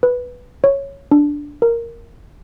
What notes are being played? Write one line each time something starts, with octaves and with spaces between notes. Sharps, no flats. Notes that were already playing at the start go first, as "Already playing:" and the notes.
B4
C#5
D4
A#4